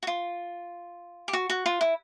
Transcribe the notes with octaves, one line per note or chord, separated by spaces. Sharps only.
F#4
F4
G4
F#4
F#4
F4
E4